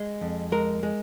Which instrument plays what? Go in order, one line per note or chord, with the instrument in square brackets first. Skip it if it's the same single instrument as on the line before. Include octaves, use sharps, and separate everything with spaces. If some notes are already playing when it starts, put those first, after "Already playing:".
Already playing: [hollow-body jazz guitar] G#3
F2
G#3 A#4
G#3